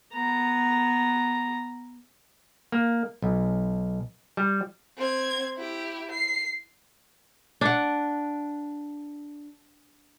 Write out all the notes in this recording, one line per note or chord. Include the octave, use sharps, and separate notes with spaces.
B3 A#5
A#3
B1
G3
C4 G#6
E4 G4
C7
D4 F#5